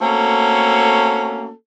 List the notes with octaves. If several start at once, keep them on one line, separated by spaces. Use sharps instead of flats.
A3 A#3 C4 C#4 F#4 A4